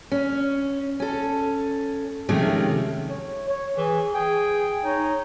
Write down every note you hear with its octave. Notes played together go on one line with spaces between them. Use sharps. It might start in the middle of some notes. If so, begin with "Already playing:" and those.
C#4
C#4 A4
C3 D#3 F3 G#3 A3 C#4
C#5
C#5
E3 G#4
G#4 G5
D#4 C#5